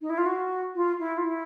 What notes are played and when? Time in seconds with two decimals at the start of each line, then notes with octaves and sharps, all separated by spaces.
0.01 D#4
0.09 E4
0.17 F4
0.25 F#4
0.75 F4
0.99 E4
1.17 F4
1.23 E4